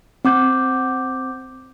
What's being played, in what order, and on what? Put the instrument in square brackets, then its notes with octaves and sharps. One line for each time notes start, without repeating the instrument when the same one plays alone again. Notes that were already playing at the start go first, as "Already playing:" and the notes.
[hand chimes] C4 D6 G6